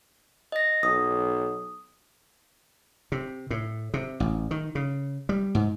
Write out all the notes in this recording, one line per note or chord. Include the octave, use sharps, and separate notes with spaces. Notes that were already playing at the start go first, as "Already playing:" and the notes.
D#5 A#6
B1 D#6
C3
A2
C3
A1
D#3
C#3
G3
G#2